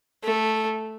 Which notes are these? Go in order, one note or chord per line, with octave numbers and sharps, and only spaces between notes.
A3